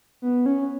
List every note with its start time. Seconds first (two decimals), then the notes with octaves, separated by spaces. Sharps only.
0.22 B3
0.46 C#4